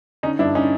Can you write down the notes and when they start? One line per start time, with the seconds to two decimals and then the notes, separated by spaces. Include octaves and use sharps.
0.23 D3 C#4 D#4
0.39 G2 D4 E4
0.55 C#4 D#4